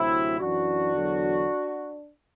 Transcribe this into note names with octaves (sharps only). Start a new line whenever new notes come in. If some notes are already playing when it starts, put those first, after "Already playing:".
Already playing: D2 C3 F#3 C4 E4
F#2 E3 D4 F#4
E2 D3 F#3